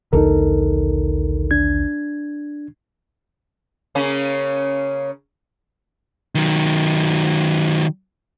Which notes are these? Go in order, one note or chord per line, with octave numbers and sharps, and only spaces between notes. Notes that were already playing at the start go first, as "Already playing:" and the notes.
A#1 D#2 D3 D#4 A4 A#4
D4 G#6
C#3 A#3 C#4
D#3 F#3